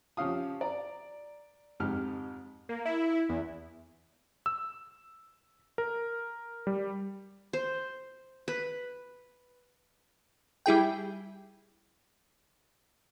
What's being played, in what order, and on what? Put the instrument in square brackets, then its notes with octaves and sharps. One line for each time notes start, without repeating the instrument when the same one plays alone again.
[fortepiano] F3 C#4 G4 F5 D#6
D5 A#5
F2 G#2 G4 F6
[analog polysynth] A#3
E4
E2
[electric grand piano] E6
A#4
G3
[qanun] C5
B4
[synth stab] G3 E4 G#4 G5